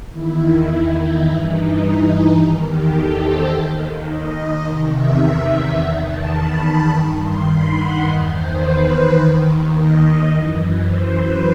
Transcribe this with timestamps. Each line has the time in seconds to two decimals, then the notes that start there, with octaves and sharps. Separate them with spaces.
0.11 E2 D#3 E4
0.96 D#4
1.25 G2 E3 E4
1.53 D#4
1.81 D#4
2.38 E2 D#3
2.66 G4
2.94 A4
3.23 C5
3.51 D#2 D#3
4.08 D#5
4.65 E2 C3 D#3
4.93 E5
5.77 E2 D#3 F#5
6.06 A5
6.34 B5
6.90 G2 D#3 G5
7.19 C6
7.47 B5
7.76 F#5
8.04 E2 D#3 D#5
8.32 C5
8.61 B4
9.17 D#2 D#3
9.73 D#5
10.30 F#2 E3
10.87 C5
11.16 B4